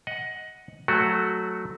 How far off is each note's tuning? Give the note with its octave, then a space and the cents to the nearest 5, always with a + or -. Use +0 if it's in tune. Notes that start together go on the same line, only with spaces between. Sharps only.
D#5 +15 F#5 +0
F#3 +0 A3 +0 F#4 +0